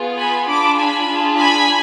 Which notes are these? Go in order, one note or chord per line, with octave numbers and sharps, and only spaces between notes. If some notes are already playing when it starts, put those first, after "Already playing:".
Already playing: B3 F4 G#4
G#5 B5
D4 F4 G#4 B5 D6
G#5 B5
D4 F4 G#4
G#5 B5